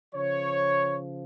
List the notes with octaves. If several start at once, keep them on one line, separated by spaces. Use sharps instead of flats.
C#3 F3 C#5